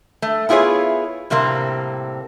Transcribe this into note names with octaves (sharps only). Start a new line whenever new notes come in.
A3
B3 E4 F4 G#4 C#5
A2 C3 G3 A#3 C4